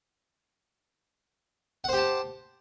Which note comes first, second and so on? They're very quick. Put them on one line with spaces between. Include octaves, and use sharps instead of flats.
F#5 C5 G4 A5